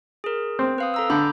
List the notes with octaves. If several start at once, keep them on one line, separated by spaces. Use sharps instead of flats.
G#4 A#4
C4
B4 F5 D#6
A4 A#5 E6
D3 B5 D6 G6